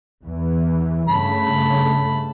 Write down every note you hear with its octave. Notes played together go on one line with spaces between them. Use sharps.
E2 E3
G2 C#3 A3 A5 B5